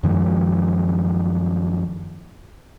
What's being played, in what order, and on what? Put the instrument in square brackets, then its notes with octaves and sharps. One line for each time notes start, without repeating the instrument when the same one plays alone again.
[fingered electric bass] F#2 D#3 F3 G#3